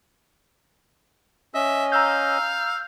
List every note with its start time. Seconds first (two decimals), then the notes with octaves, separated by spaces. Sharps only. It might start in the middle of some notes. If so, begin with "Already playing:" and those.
1.54 C#4 D#5 E5
1.92 F5 A#5 E6 G6